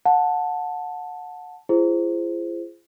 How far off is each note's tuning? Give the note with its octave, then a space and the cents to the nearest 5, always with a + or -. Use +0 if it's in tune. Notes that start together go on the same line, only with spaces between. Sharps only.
F#5 -25 A5 +0
F4 -45 G#4 +0 C5 +0